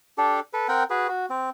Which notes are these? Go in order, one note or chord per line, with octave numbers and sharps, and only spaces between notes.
D4 G4 A4
A4 B4
C4 A#4 F#5 G5
F#4 G#4 B4
F#4
C4